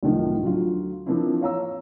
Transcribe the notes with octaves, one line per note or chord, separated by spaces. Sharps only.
C2 F#2 A2 D#3 F3
D2 D3 F#3 F4
E3 F3 A#3 C4 D4 E4
C#5 F5 A#5 E6